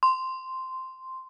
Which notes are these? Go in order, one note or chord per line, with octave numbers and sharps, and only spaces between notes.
C6